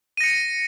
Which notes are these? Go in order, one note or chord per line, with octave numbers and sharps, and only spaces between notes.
A#6 C#7 D#7